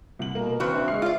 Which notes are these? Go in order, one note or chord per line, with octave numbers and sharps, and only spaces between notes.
C2 F#7
B2 A#3 A#4
C#3 E3 C4 F#4 B4
D4 E5
G#3 C#6 F6 C7
F4 D5